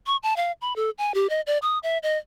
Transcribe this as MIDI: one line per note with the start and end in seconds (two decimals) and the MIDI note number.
0.07 0.17 85
0.23 0.36 81
0.36 0.52 77
0.61 0.75 83
0.76 0.90 69
0.98 1.14 80
1.14 1.29 67
1.29 1.41 75
1.47 1.58 74
1.62 1.78 87
1.83 1.98 76
2.03 2.17 75